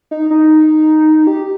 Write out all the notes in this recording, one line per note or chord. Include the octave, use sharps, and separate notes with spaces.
D#4
D#4
G4